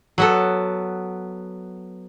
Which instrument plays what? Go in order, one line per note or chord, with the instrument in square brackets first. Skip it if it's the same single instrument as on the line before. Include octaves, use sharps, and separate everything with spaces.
[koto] F#3 B3 A4